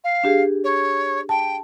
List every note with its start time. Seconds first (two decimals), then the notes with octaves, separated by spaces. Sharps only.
0.04 F5
0.24 D4 G4 G#4
0.64 C#5
1.29 G5 A5